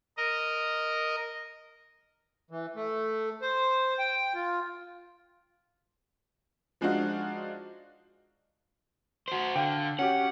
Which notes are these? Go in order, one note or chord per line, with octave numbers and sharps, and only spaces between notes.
A#4 D#5
E3
A3
C5
G5
F4
F3 G#3 D4 D#4 F4 F#4
F#4 C5
D3 F5 G5
C#4 F#4 G4 F#5